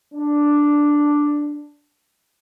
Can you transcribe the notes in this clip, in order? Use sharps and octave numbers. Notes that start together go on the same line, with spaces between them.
D4